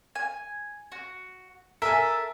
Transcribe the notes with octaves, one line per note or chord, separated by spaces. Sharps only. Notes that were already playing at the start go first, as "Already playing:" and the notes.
G#5
F#4
A4 A#4 E5 G#5